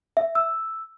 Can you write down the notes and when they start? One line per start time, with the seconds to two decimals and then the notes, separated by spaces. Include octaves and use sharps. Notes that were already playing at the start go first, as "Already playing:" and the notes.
0.17 E5
0.35 E6